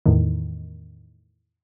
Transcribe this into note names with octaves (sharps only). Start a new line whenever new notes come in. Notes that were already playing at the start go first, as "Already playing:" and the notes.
E2 A2 D#3